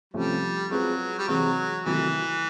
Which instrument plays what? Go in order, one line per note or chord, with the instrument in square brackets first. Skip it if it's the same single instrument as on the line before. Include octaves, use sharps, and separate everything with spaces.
[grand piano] C3 F3 A3 C#4 [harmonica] G3
[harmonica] F#3 [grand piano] G#3 C4 F4 G#4 B4
[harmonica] G3
[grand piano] C3 E3 G#3 C4 [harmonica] F#3
[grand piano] C3 D#3 F#3 A3 [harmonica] E3